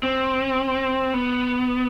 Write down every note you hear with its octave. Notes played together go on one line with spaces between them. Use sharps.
C4
B3